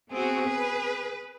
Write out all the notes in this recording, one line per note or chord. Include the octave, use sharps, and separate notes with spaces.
B3 C4 F#4 G#4
B4